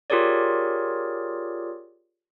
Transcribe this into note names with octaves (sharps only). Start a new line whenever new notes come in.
F4 G4 G#4 A#4 C#5 D5